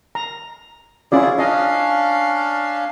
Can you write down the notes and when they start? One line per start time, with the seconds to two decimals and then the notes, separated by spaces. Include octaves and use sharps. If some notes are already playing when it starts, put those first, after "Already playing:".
0.15 A#5
1.12 C#4 E4 F4 G#4 D5
1.39 C#4 D4 D#5 F5